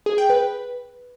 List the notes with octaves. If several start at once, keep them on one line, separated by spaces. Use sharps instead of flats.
G#4
G5
B4